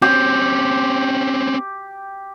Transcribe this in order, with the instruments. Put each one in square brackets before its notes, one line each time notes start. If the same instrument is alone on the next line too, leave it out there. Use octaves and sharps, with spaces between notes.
[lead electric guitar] C4 C#4 [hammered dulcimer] G4